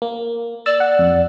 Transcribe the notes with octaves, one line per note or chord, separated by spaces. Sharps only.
A#3
D5 E6 A6
F#5
F2